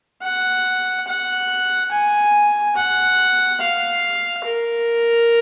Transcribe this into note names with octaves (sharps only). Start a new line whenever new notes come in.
F#5
F#5
G#5
F#5
F5
A#4